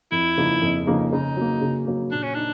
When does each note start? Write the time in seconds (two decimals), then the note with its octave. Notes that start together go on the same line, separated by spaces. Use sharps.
0.12 F2 E4
0.38 C#3 F3 A#3 D#4
0.62 F2
0.87 C#3 F3 A#3 D#4
1.12 C#3 D#4
1.37 F#3 A#3
1.62 C#3
1.87 F#3 A#3
2.12 A#2 D4
2.23 C#4
2.34 D4 D#4